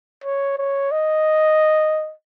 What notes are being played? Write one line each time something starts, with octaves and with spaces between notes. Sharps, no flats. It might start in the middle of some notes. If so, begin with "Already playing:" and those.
C#5
C#5
D#5